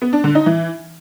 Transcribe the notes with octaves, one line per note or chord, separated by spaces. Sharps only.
B3
D4
D3
D#4
E3